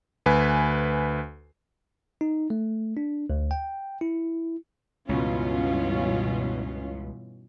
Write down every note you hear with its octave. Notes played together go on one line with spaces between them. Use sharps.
D2 B4 G#5
D#4
A3
D4
D2
G5
E4
C#2 G2 B2 E3 C#4 F4